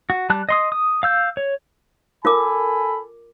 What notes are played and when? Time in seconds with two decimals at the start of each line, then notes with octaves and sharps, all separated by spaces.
0.10 F#4
0.30 G3 A5 F#6
0.49 D#5 C6 D#6
0.72 D#6
1.03 F5 E6 G6
1.37 C#5
2.25 F4 A4 A#4 G#5 B5 D6